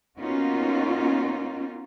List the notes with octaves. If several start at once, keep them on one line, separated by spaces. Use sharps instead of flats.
A#3 B3 C#4 D#4 F4 F#4